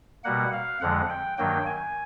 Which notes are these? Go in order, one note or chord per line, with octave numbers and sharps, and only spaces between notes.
B2 G3 A#3 F#5
F5
F2 D3 F3 G#3 F#5
G5
G2 D#3 F#3 A#3 G5
G#5